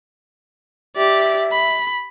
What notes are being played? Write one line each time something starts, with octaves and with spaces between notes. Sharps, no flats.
G4 D5 E5
B5